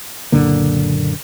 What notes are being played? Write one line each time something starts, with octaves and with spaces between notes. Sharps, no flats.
F#1 A#2 D3 A#3